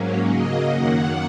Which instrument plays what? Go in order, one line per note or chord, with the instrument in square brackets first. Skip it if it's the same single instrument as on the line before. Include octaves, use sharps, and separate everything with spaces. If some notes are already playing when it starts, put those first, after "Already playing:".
Already playing: [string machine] G#2 F#3 A#3 C#4
C#3 F#3 A#3 D#5
F#2 D#3 A#3 F#5